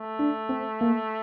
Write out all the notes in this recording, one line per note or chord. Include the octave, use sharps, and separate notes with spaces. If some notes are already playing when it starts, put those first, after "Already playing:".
Already playing: A3
D4
C4
A#3